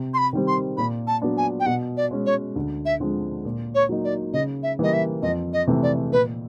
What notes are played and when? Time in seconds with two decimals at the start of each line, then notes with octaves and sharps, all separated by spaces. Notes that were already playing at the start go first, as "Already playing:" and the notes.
Already playing: C3
0.14 C6
0.18 B5
0.33 D#3 G3 C4
0.47 C6
0.77 A#2 B5
1.07 A5
1.22 F#3 B3 D4
1.37 G#5
1.60 G5
1.66 B2 F#5
1.97 D5
2.11 G#3 C#4
2.26 C#5
2.56 D2
2.85 E5
3.00 D3 F3 G#3 C4
3.45 A#2
3.75 C#5
3.89 F#3 A#3 D#4
4.04 D5
4.33 C#3 D#5
4.63 E5
4.79 E3 G3 A#3 D#5
4.93 E5
5.22 F2 D#5
5.53 D#5
5.67 C3 E3 A3
5.83 D5
6.11 A#2 B4